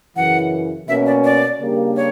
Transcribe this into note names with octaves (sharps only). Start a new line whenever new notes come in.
F#2 C#3 E3 F#5
B2 A#3 C#4 E5
D5
D5
C#3 G3 A#3 D4 G4
C#5